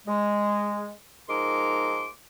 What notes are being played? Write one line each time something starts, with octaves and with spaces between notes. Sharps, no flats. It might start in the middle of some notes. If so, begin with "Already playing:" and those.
G#3
F3 G#3 D#4 A#4 C6 D6